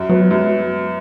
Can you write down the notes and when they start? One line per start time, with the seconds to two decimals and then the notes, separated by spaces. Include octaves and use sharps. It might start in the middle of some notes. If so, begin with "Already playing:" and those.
Already playing: F#2
0.09 F#3 B3
0.30 F#2 G#3